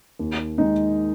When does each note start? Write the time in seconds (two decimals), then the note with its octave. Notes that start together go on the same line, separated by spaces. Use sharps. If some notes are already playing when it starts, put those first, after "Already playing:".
0.19 D#2
0.58 D#3 G#3 D#4